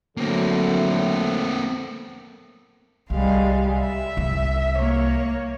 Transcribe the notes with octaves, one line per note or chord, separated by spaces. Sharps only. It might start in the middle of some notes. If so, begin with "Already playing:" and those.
D3 F#3 A3 A#3 C4
C2 G3 G#3 F5
E5
C2
A#3 C#5